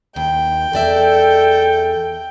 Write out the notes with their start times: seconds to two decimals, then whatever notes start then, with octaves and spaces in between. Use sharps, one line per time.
0.16 D#2 G5
0.73 E2 A4 D5 E5